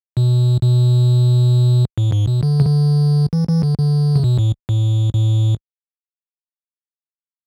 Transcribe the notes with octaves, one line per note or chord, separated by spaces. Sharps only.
B2
B2
A2
G#2
B2
D3
C#3
D3
E3
E3
D3
D3
C#3
B2
A2
A2
A2